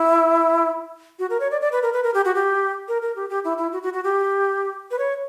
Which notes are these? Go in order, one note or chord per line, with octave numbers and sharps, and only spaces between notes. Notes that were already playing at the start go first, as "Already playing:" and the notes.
Already playing: E4
F#4
A#4
C#5
D5
D5
B4
A#4
B4
A#4
G4
F#4
G4
A#4
A#4
G4
G4
E4
E4
F#4
F#4
F#4
G4
B4
C#5